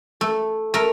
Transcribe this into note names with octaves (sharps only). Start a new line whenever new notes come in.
A3
A3 A#4